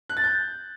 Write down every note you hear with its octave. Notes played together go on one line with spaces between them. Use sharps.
F#6
A6
G6